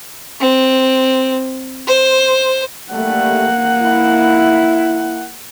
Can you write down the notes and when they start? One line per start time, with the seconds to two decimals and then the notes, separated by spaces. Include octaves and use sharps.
0.40 C4
1.87 C5
2.92 G3 A3 A#3 F#5
3.82 E4